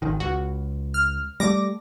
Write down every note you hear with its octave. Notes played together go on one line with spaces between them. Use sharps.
G#1 D#3
C#2 F#4
F6
G3 A3 D6 A#6